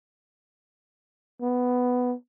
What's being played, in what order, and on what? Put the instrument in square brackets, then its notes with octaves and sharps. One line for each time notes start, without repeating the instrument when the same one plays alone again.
[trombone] B3